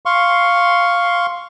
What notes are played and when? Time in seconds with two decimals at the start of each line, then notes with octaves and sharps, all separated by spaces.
0.06 F5 C6 C#6